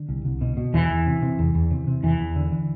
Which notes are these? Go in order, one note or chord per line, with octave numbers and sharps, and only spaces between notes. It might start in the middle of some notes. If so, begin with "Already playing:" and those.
Already playing: D3
C2
C2
B2
B2
E2 E3
E2
C3
C3
E2
E2
C3
C3
E2 E3
E2
D3
D3